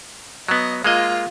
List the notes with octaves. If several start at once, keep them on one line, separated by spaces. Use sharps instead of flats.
F#3 B3 D#5
G#3 A#3 F4 D#5